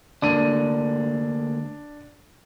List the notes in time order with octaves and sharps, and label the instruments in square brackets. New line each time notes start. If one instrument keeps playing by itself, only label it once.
[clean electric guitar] D3 A3 A#3 [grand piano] D4 D#7